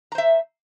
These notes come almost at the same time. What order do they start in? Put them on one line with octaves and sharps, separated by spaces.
A#5 C5 E5